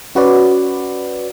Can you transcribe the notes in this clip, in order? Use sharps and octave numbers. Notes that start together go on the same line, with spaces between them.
C#4 F#4 B4 D5